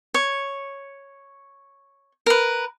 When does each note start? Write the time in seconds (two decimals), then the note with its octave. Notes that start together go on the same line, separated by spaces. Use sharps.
0.14 C#5
2.26 A#4 B4